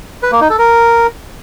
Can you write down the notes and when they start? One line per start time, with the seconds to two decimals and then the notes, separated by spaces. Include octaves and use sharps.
0.23 B4
0.32 A#3
0.41 D#4
0.50 A4
0.59 A#4